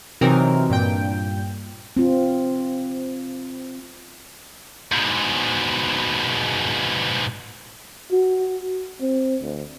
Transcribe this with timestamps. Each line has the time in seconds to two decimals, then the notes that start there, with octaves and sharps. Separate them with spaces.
0.21 C3 E3 F#3 C4 D#4 A#4
0.70 G2 A#2 G5
1.97 C4 F4
4.92 G#2 B2
8.12 F#4
9.01 C4
9.42 D2